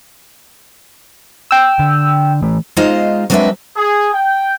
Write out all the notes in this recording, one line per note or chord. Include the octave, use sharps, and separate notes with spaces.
G5 E6
D3
E3 A3
G#3 D#4 F4 C5 D#5 F5
F#3 G#3 C4 D4 B4 E5
G#4
G5